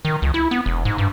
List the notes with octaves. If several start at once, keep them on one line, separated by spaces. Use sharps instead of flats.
D#3
C#2
E4
B3
E1
G#2
G2